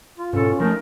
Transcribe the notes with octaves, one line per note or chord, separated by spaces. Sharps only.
F4
G#2 B2 C#4 A4
F3 G#3 A3 D#4 A#4